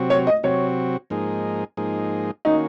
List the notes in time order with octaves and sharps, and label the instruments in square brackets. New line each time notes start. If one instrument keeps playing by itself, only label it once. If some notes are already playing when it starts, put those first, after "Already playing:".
Already playing: [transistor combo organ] C3 F#3 C4 F#4
[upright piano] C#5
D#5
[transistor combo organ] C3 F#3 C4 F#4 [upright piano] C#5
[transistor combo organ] G#2 F3 A#3 D#4 G#4
G#2 F3 A#3 D#4 G#4
[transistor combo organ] D#3 A#3 C#4 F#4 [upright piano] D#4